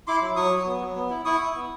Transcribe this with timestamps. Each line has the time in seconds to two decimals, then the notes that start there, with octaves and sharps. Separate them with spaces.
0.07 E4 C6 D6
0.21 F#3
0.36 F#3 C#6 D#6
0.51 F#3
0.66 B3
0.81 F#3
0.96 B3
1.10 E4
1.25 E4 C#6 D#6
1.40 E4
1.55 B3